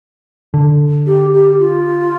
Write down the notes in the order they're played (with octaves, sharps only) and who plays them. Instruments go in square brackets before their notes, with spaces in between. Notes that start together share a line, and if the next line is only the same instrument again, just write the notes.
[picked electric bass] D3
[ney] G4
G4
F4